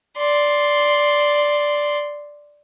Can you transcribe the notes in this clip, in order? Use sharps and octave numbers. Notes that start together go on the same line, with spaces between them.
D5 C6